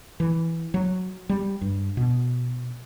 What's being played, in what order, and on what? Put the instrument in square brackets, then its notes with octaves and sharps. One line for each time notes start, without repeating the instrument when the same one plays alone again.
[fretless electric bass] E3
F#3
G3
G2
B2